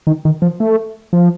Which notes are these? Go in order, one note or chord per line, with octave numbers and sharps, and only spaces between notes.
D#3
D#3
F3
A3
F3